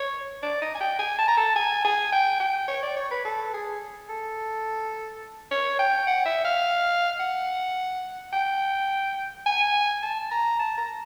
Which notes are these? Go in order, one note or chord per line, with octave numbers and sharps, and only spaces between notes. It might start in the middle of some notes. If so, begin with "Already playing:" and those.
Already playing: C#5
D5
D#5
G#5
G5
G#5
A5
A#5
A5
G#5
G#5
G5
G5
C#5
D5
C#5
B4
A4
G#4
A4
C#5
G5
F#5
E5
F5
F#5
G5
G#5
A5
A#5
A5
A#5